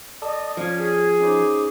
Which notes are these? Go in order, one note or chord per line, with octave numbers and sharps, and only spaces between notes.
A4 D5 D#5 A5 D#6
F3 C#4
G#4
C#4 D#4 C5 D6